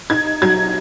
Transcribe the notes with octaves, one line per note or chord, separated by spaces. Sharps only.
D#4 G#6
F#3 G#6